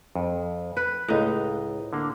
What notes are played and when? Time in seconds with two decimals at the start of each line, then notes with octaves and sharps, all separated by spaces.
0.16 F2
0.77 B4
1.08 C#2 A2 D#4 D#5 A#5
1.93 D3 A#3